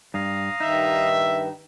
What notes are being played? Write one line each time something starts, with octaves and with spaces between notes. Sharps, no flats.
G2 F5 A#5 D#6
G2 D#3 D#4 E5